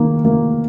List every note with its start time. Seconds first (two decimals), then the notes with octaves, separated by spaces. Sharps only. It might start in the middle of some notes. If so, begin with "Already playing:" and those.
Already playing: D#3 A#3
0.25 A#3